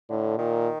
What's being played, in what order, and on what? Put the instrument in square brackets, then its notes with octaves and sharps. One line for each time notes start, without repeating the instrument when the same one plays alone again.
[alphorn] A2 [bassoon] D3
[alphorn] A#2 [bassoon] D#3